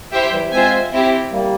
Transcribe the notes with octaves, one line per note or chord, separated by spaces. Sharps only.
E4 G4 C5 E5 G5
E3 G3
G#3 C4 F4 C5 E5 G#5
C4 E4 G4
G3 A#3